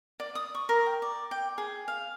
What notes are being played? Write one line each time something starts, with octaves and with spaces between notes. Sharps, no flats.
D5
D#6
C#6
A#4
G5
D5
G5
G#4
F5